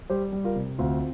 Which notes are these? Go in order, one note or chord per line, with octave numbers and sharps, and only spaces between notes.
G3 G4 C5
G3
F4 A#4
C3
D2 C4 F4